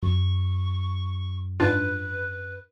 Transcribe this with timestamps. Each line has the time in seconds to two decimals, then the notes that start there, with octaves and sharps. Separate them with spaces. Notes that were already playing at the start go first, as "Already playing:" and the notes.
0.03 F#2 C#6
1.60 G#2 D4 F4 B4